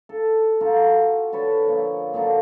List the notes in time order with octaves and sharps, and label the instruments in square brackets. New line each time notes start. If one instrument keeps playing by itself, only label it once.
[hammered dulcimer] A4
F4 F#4 A4 A#5
D3 A4 B4 C#5
A#2 F3
A#2 D3 F#3 D4